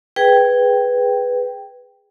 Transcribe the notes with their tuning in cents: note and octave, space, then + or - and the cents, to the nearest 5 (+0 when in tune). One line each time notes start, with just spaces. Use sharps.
G#4 -5 B4 +0 G5 +0